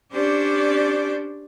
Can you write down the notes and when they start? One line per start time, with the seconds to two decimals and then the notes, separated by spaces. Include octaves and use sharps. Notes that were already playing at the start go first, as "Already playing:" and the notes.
0.12 C#4 D4 G4 C5 D5